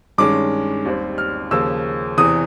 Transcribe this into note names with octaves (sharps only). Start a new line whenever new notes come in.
G2 D#3 G#3 C#4 D6
D#2 D#3 G3 C4
F6
D#2 C#3 F3 A#3 E6
E2 C3 E3 D#6